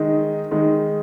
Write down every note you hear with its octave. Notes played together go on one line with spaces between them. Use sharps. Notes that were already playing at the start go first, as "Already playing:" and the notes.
Already playing: D#3 G#3 D#4
D#3 G#3 D#4